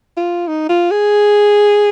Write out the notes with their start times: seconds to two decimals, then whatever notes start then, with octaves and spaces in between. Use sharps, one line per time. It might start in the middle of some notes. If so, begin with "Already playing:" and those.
0.17 F4
0.48 D#4
0.69 F4
0.91 G#4